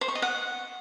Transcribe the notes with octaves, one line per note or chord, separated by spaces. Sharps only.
C5
C#6
D#5
F#5